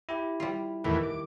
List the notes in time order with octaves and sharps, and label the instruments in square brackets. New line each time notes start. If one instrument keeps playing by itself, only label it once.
[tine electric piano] E4 G4
[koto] G3 F4
[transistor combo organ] E2 A2 E3 [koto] D#3
[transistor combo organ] D6